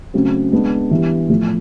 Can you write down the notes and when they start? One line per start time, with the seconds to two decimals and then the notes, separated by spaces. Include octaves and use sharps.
0.14 C#3 F#3 A3 C4
0.52 G#3 B3 D4
0.91 E3 G3 B3
1.30 A2 F3 A3